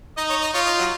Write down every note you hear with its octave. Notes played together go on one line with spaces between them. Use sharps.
D#4 D#5
C#5
D#5
F4 C#5
D#4
F#3